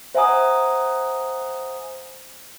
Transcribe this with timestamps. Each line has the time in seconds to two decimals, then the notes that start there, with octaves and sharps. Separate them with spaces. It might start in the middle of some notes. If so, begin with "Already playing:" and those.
0.15 C5 E5 F#5 G#5 A#5 D#6